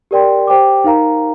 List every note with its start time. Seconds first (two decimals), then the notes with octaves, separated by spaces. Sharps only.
0.11 G4 A#4 D5 G5 C6
0.47 G4 C5 G5 D6
0.84 D#4 A#4 F5 A#5